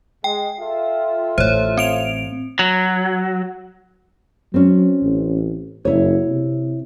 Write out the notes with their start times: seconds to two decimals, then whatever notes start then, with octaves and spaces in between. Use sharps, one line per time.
0.24 G#3 G5
0.60 F4 A4 E5
1.38 A1 C5 C#5
1.77 C4 D7 F7
2.59 F#3
4.54 F#3 C4 C#4
5.02 A1
5.85 F#1 E4 C#5
6.28 C3